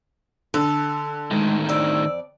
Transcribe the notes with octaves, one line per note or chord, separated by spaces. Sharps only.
D3 A4
A2 D#3 G#3
F2 D5 E6